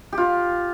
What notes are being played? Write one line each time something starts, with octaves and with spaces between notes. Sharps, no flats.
G4
F4